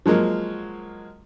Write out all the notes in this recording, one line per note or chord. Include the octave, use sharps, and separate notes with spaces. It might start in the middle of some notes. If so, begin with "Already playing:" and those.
F3 F#3 G#3 A#3